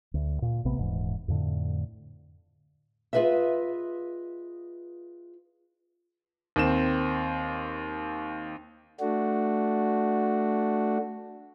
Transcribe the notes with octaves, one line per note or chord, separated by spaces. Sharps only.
D2
A#2
A#1 C3 A3 B3
D#1 G#2 E3
F2 A2 D3
F4 G#4 B4 D#5 E5
D#2 C4 E7
A3 D4 F#4